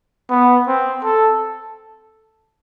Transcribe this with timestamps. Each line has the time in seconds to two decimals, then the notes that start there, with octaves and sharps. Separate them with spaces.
0.30 B3
0.68 C4
1.04 A4